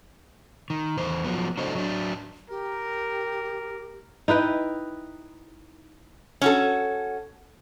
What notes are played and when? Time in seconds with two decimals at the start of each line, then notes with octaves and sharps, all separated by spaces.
0.70 D#3
0.97 E2 C5
1.24 F3 F#3 B3
1.57 D4 F#4 A4 C5 D#5
1.75 F#3 D4
2.50 G4 A#4
4.28 D#4 E4 B4 G5
6.41 C#4 F#4 A4